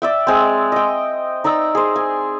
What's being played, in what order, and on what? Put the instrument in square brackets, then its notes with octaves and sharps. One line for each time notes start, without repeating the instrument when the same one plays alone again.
[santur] D5 E5 G5
G#3 C4
D#5 G5
D#4 D5 A#5 E6
G#4 C5
G#5